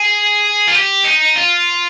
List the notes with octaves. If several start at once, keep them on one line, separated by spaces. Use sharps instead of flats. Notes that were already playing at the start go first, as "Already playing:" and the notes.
Already playing: G#4
F4
G4
D#4
F4